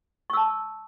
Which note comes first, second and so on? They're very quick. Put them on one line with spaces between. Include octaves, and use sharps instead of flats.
C#6 E6 A5